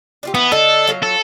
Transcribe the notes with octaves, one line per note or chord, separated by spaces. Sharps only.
D4 F4 G4
E3 B3
D3 D4 A4 D#5
F#3 F4
A4